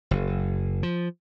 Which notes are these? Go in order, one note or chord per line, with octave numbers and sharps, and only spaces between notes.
F#1
F3